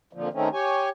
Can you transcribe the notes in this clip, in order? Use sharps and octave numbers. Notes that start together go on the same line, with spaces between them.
F2 A#2 D3 F3
D#3 A3 C4 C#4
G4 C#5 G#5